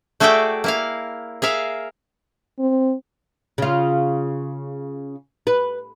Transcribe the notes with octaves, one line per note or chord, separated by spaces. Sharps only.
A3 F#4 G#4 D5 E5 G5
A#3 E4 F5
G#4 A#4 E5 F5
C4
C#3 F4
B4